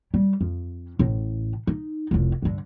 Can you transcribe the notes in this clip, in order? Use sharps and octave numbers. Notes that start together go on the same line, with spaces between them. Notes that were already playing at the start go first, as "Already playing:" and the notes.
G3
F2
A1 A2
D#4
F1 C2
G2 D3